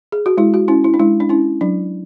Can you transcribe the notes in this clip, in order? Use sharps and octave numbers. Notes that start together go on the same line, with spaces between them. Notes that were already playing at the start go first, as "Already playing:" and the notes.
G#4
F#4
G#3 E4
F#4
C#4 E4
E4
D4
G#3 E4
D4
C#4 E4
F#3 D4